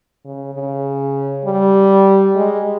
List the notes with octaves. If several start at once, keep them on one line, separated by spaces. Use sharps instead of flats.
C#3
C#3
G3
G#3